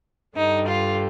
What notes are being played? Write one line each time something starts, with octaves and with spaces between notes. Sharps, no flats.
G2 D3 G3 D#4
F4